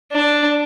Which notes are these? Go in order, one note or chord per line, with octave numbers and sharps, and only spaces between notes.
D4